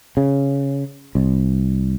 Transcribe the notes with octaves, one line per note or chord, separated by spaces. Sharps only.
C#3
C2